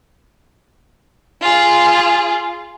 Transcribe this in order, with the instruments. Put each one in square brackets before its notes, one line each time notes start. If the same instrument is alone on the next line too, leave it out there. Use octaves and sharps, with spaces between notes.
[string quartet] F4 G#4